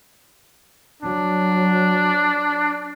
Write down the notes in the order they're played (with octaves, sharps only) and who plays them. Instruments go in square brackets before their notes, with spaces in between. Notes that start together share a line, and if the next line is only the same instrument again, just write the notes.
[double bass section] F#3 [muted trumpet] D4